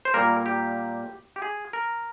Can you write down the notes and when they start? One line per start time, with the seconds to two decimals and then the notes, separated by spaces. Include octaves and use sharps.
0.05 C5
0.14 A#2 G3 A#3 A#4
0.46 G4
1.36 G4
1.42 G#4
1.73 A#4